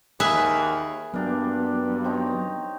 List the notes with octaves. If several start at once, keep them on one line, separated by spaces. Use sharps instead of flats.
D#2 G#4 B4 E5
G2 F#3 A#3 B3 D4 G4
C4 D#4 C#5